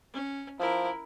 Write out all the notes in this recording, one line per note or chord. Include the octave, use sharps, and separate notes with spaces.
C#4
F3 E4 A#4